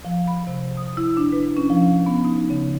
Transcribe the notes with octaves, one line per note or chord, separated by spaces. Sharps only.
F3
B5
C3
D#6
E4
D4
B4
C#4
F3
B3
D#4
C#3